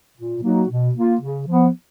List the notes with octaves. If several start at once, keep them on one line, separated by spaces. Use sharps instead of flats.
A#2
F#3 A#3 D#4 F#4
B2
A#3 F4
C#3
F3 B3